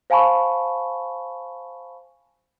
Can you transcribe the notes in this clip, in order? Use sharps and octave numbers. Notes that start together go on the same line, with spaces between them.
C5 F5 G#5 A5 B5 C#6